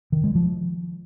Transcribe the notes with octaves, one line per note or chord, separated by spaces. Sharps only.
D#3
G#3
F3